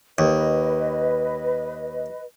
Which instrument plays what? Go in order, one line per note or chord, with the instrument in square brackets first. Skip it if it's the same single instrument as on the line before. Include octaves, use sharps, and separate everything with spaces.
[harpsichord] D#2 [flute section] B4 D#5